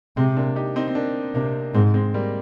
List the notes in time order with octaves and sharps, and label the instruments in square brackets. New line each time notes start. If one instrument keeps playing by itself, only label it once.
[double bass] C3 [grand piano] G#3 C4
[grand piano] A#3 D4
D#4 G4
C4 D#4
C4
A#3 D4
[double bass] C3 [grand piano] A#3 D4
[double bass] G#2 [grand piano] G#3 C4
[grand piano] G#3 C4
G3 A#3